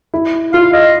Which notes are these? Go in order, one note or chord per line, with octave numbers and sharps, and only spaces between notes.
E4
F4 F5
D#5